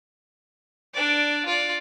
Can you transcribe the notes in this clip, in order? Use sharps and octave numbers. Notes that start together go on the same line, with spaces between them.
D4 D5
F4 D5